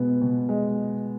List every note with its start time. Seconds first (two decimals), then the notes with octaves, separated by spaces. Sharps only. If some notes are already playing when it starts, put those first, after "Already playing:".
Already playing: B2 G#3 B3
0.22 B2
0.49 G#3